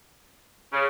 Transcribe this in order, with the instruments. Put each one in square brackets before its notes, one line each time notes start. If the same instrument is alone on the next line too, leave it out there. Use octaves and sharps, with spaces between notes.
[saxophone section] C#3